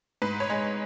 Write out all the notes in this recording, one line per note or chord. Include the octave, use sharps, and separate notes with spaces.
G#2 B4
C#5
G#3